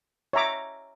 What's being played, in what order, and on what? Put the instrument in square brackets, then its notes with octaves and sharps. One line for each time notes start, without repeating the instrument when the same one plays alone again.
[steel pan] C#5 E5 A#5 D6